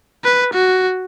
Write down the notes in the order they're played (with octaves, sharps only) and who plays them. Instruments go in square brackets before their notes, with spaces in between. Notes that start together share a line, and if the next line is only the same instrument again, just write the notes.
[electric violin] B4
F#4